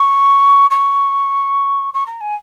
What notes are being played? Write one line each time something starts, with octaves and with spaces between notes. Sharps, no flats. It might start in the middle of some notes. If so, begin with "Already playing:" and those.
Already playing: C#6
C#6
C#6
A#5
G#5